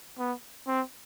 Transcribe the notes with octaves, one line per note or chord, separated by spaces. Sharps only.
B3
C4